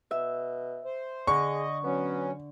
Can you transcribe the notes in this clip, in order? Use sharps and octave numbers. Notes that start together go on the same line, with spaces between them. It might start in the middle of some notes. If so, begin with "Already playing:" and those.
B2 E5
C5
D3 G#4 D#5 C#6
F#3 B3 C#4